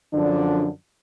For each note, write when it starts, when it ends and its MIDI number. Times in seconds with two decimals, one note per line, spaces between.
0.13 0.68 42
0.13 0.68 50
0.13 0.68 53
0.13 0.68 62